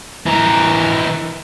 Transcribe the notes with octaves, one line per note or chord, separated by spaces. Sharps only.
E3 A#4